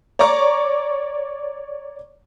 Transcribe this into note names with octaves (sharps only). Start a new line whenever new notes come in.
C#5 D5 A#5 C#6 D6